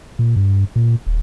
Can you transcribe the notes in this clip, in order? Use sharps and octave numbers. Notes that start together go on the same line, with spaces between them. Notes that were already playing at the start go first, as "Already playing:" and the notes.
A#2
G2
A#2
D#1